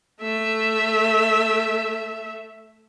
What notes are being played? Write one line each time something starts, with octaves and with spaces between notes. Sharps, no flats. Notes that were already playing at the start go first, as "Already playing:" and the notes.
A3 E5